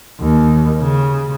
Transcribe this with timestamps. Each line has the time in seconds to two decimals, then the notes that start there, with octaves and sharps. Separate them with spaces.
0.21 D#2
0.82 C#3